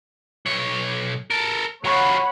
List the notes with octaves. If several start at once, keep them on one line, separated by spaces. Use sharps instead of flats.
B1 C#5
A4 A#4
F#3 F4 C#5 F#5 B5